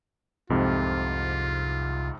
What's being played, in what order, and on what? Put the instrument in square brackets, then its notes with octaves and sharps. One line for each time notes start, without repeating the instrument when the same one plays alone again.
[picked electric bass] C2 [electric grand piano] F2 G#2 C3 [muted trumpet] F4